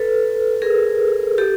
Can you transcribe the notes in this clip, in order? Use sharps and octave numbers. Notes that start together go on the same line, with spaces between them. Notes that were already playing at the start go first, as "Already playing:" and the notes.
Already playing: A4 B4
G#4 A#4
G4 A4